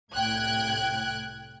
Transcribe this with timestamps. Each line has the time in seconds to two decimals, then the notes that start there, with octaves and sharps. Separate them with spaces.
0.15 C2 A2 G5 F#6 G#6